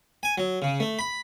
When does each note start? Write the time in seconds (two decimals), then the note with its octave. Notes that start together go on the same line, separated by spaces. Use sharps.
0.23 G#5
0.38 F#3
0.62 C#3
0.80 A3
0.99 B5